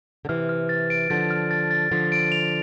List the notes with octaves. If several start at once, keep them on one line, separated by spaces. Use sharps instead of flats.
D3
C3 E3 F6
F6
A6
D7
D3 F3 A6
F6
A6
A6
D3 F3 A6
D7
F7